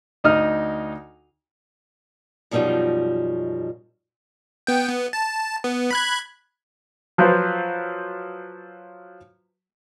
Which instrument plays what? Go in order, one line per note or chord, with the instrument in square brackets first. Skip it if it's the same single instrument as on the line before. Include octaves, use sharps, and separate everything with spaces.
[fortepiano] D2 D#4 D#6 F6
[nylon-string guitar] F#2 B2 F3 G3 D#4 F4
[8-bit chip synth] B3 G5
B3
A5
B3
B5 F#6 G#6
[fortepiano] F3 F#3 F4 B4 C5